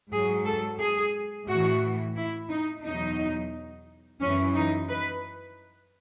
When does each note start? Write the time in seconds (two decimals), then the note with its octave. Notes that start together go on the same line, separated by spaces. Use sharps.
0.11 G#2 F#3 G#4
0.45 A4
0.79 G#4
1.47 A2 E3 F#4
2.15 E4
2.49 D#4
2.84 E2 B2 F#3 D#4
4.20 F#2 E3 C#4
4.54 D#4
4.89 B4